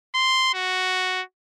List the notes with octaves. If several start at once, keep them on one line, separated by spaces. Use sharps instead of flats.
C6
F#4